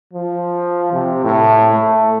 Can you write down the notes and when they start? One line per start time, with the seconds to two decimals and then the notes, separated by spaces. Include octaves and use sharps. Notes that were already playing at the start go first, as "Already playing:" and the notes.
0.13 F3
0.93 C3
1.24 A2
1.73 A3